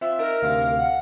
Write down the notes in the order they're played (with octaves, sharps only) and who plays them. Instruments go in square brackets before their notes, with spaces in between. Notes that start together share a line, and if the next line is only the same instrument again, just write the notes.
[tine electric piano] C4 F4 [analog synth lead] E5
[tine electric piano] D#4 [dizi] A#4
[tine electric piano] D2 C3 [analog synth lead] F5
[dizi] F#5